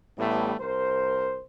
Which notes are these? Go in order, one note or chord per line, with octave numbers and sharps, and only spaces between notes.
A1 A2 G3 A3 B3
C2 A#4 C5